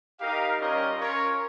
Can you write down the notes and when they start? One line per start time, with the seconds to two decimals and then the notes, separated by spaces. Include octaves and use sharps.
0.20 D#4 G4 A#4 F5
0.59 G3 C#4 F4 A#4 D#5
0.96 C#4 F4 A#4 C#5